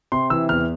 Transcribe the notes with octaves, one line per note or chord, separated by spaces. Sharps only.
C3 C6
E3 E6
E2 F6